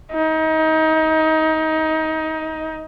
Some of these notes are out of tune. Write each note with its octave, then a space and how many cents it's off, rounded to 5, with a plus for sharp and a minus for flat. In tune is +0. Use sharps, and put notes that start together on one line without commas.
D#4 +25